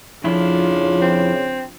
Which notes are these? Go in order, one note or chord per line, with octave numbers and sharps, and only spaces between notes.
F2 C#3 F3 D4 E4 F4
C4